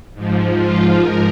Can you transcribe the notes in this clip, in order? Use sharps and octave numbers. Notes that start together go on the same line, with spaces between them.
G#2 F3
F4
G#2 F3 A#4